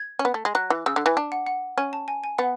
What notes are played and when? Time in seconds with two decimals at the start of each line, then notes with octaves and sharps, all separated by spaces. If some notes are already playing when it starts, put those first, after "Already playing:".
Already playing: G#6
0.19 C#4
0.25 B3
0.34 A3
0.45 G#3
0.55 F#3 F#6
0.70 E3
0.86 C#3 E6
0.96 D3
1.06 E3
1.17 D4
1.32 F#5
1.47 F#5
1.78 C#4 G#5
1.93 A5
2.08 G#5
2.24 G#5
2.38 B3 F#5